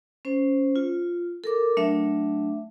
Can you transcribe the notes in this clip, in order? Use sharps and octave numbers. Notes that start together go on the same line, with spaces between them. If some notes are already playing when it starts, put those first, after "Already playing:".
C#4 C5
F4
A4 A#4 D6
F#3 A3 D4 E5